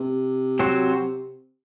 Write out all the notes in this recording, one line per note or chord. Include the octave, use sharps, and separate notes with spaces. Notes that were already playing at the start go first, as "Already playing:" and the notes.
Already playing: C3
F#3 C4 F#4 C5